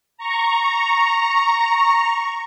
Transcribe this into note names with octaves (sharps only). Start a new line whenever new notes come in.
A#5 C#6